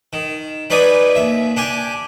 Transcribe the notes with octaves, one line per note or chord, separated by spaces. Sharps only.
D#3
F#3 D#4 B4 D5 G#5
D#2 E5
D4 G4 G#5